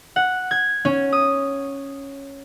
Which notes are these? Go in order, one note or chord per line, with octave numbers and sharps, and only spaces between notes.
F#5
G#6
C#4
D#6